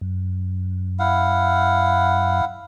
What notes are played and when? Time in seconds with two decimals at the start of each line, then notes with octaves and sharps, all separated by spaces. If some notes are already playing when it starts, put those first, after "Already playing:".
0.01 F#2
0.99 E4 F5 F#5